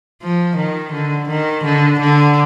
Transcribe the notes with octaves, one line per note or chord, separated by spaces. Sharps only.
F3
D#3
D3
D#3
D3
D3